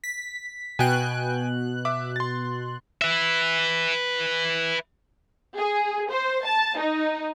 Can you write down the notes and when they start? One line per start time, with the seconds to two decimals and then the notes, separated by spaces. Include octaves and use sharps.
0.04 B6
0.79 B2 G5 G#5 F#6
1.85 E5 D6
2.16 C6 A6
3.02 B4 E5
5.56 G#4
6.10 C5
6.45 A5
6.77 D#4